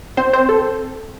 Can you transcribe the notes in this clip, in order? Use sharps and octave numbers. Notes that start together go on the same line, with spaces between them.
C4 C5
C4 C5
A4